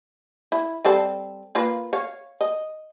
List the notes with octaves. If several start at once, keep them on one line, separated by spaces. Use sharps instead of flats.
E4
G3 C4 A4
A#3 F4 B4
C#5 F5
D#5